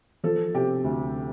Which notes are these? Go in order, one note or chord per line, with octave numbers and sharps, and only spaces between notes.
F3 A4
C3 G4
D2